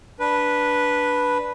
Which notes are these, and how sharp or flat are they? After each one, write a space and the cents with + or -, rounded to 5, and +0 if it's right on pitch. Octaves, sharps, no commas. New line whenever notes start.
D4 +0 B4 -5